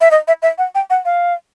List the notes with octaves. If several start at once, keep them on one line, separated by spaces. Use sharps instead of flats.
E5
D#5
E5
E5
F#5
G5
F#5
F5